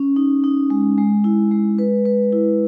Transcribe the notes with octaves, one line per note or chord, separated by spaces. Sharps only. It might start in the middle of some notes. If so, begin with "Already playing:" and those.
Already playing: C#4
D#4
D#4
G#3
G#3
E4
G#3
B4
B4
E4